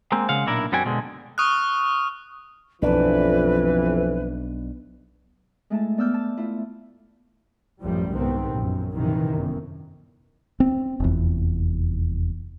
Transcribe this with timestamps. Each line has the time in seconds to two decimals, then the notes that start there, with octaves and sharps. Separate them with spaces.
0.12 G#3 A#3 C4
0.29 C#3 G#3 F5 F#5
0.46 B1 A#2 D4 E4 A#4
0.72 F#2 G3 C4 F#4 G5 G#5
0.85 B2 D3 G#3
1.38 C#6 D#6 F6 F#6
2.82 B1 F2 E3 D4 B4
5.70 G#3 A3 E4 A5
5.98 B3 D5 D6 E6 F6 G6
6.14 A5
6.37 A3 E4 F4
7.83 A1 F#2 F3 G3
8.13 C2 G#2 C3 D#3 B3 C4
8.53 A#1 F#2
8.92 A#1 F#2 C3 D#3 E3
9.30 G1 F#2
10.60 C4
11.00 F1 E2